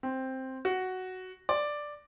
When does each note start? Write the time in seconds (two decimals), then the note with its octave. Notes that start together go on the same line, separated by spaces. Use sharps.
0.03 C4
0.65 F#4
1.49 D5